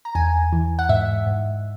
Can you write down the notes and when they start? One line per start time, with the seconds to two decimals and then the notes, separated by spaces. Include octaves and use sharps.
0.05 A#5
0.15 E2 G#5
0.53 E3
0.79 F#5
0.89 G#2 E5
1.26 G#2